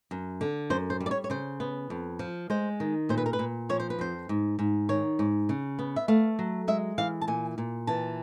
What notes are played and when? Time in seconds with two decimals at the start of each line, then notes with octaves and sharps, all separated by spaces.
0.11 F#2
0.41 D3
0.70 F#2 C5
0.90 C5
1.00 G3
1.06 D5
1.11 C#5
1.24 C#5
1.30 C#3 C5
1.60 B3
1.90 F2
2.19 F3
2.50 G#3 C5
2.80 D#3
3.09 A#2 C5
3.17 B4
3.26 A#4
3.33 B4
3.39 A#2
3.69 F3 C#5
3.80 C5
3.90 B4
3.99 F2 C5
4.29 G#2
4.59 G#2
4.89 D#3 C#5
5.19 G#2
5.49 C#3
5.79 B3
5.96 E5
6.08 A3 F5
6.39 F#3
6.68 G#3 E5
6.98 E3 F5
7.21 A5
7.28 A#2 G#5
7.58 A#2
7.87 E3 A5